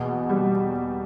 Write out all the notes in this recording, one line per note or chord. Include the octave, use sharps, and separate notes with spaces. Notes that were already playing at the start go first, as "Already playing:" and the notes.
Already playing: E2 B2
G3